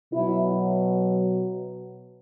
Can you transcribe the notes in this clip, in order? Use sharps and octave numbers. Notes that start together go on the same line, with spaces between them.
B2 F#3 E4